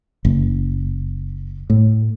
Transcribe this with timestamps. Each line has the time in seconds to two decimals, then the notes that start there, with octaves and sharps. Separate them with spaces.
0.25 F#1
1.70 A2